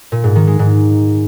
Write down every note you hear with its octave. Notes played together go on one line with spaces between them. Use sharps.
A#2
G#2
D#3
G#3
G#2